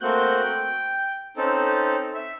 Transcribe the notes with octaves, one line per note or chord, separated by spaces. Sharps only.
A3 A#3 C4 F#4 F#6 G6
G5
C4 C#4 D#4 A4
E5